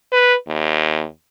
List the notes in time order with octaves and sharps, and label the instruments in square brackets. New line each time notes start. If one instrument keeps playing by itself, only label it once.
[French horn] B4
D#2